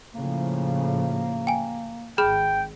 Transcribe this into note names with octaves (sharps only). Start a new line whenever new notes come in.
A2 C#3 F3 A#3
G5 G#5
G#1 G#4 G5 B5 F6